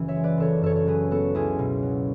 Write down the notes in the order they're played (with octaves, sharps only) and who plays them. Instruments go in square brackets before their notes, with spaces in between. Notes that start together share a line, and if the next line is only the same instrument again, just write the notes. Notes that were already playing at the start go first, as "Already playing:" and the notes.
Already playing: [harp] F#1 E3
C#5 E5
G#3
B4 D5
F#1 A4 C#5
F#2 A4 C#5
C#5
F#3 G#4 B4
B3 F#4 A4
C#2 E4 G#4
B2
F#3